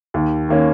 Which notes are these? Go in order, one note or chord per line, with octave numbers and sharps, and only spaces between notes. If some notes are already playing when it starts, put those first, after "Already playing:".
D#2
D#3 A#3 C#4